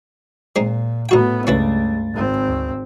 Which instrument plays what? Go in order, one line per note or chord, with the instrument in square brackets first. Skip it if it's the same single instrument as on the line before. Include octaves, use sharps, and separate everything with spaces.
[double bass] A#2 [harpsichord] G#3 C4 D#4
[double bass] A2 B3 [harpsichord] D#4 F#4 G5
[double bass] C#2 G2 [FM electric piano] C#3 A3 A6 [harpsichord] C#4 E4 B4
[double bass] G#1 C4
[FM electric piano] D2